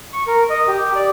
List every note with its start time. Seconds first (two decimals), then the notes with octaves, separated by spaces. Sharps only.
0.13 C#6
0.27 A#4
0.50 D#5
0.68 G4
0.95 D5